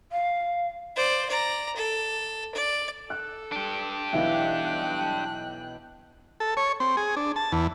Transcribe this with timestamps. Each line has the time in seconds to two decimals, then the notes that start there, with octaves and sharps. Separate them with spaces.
0.12 F5
0.96 C5 D5
1.29 D5 A#5
1.76 A4
2.55 D5
3.10 A4 F#6
3.52 D4 G4
4.13 B1 E3 E5 F5 G5 F#6
6.40 A4
6.57 C#5
6.80 C4
6.97 G#4
7.17 D4
7.36 A5
7.52 E2